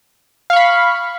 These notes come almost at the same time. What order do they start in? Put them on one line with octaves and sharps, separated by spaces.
F5 C#6 B5